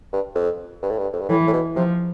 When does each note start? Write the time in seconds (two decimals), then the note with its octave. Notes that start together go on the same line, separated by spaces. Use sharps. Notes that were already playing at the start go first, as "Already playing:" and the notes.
0.13 G2
0.35 F2
0.83 G2
0.90 A2
0.98 G2
1.13 F2
1.21 G2
1.29 A2 E3
1.47 A2
1.53 B2
1.76 C3 F3